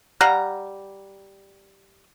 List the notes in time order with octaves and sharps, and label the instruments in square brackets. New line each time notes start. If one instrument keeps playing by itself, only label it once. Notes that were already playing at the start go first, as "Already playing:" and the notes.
[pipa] G3 F5 F#5 A#5